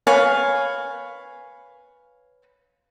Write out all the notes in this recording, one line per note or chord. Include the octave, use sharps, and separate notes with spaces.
B4 C#5 F5 G#5